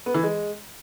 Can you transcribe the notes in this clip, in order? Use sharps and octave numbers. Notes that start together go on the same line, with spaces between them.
B3
E3
G#3